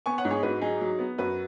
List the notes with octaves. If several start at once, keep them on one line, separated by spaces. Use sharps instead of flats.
B3 G#5 C#6
C#5 F#5
G#2
G#4 C#5
G#2 F#4 B4
F#3 D#4 G#4
F#3
B3
F#2 F#4 B4